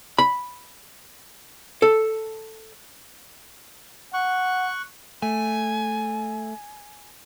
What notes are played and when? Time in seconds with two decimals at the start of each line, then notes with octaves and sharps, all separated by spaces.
0.18 B5
1.82 A4
4.14 F#5 C#6 F#6
5.22 A3 G#5